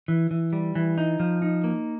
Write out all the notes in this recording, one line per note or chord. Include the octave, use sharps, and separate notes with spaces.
E3
E3
G3
E3
D#4
F3
D#4
A#3